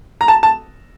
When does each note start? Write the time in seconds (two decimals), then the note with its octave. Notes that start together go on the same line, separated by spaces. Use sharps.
0.21 A#5
0.28 A5
0.43 A5